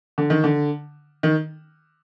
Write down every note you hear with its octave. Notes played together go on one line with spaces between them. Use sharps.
D3
D#3
D3
D#3